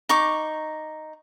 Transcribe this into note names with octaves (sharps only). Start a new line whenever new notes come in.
D#4 C#6 D6